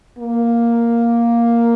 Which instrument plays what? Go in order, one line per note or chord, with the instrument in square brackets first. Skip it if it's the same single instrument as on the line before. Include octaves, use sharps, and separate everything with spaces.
[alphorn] A#3